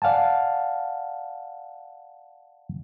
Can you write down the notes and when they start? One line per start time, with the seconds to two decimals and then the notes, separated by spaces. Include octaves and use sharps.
0.02 D5 F5 F#5 G#5 A5